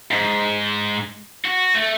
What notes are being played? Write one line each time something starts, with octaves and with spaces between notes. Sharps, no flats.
G#2
F#4
A3